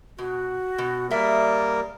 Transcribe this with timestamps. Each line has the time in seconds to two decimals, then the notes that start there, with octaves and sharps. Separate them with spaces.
0.18 B2 F#4
0.78 B2
1.11 G3 A#3 G#4 A#4 D5 E5